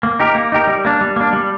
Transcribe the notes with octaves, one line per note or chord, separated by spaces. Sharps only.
A#3
D#4 G4 A#4
A#3
D#4 G4 A#4
G3
A#3 D4
G3
A#3 D4
G3